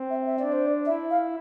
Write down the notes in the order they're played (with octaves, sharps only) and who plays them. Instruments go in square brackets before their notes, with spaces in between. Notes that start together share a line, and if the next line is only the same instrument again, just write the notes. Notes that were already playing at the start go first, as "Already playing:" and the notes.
Already playing: [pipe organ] C4
[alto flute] E5
E5
[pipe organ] D4 [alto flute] D5
[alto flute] C5
D5
[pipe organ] E4 [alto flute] E5
[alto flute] F5